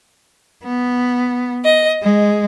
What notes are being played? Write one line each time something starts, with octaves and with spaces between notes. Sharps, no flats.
B3
D#5
G#3